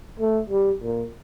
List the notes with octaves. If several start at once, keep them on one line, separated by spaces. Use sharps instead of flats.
A3
G3
A#2